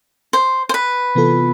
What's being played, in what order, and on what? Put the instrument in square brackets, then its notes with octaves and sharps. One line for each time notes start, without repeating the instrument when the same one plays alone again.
[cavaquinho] C5
C5
B4
[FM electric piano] C3 E3 B3 F4 A4